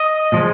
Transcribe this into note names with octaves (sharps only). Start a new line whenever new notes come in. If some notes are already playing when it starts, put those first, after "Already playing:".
Already playing: D#5
A#2 F3 G#3